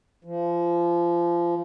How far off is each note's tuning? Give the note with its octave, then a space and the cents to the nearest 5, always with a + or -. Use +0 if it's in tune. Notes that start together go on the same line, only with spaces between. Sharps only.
F3 -25